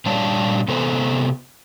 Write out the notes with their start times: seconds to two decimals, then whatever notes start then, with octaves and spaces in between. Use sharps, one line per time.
0.06 A#2 G3 D4 C#5 F5 A5
0.68 C3 B3 A4 C5 A#5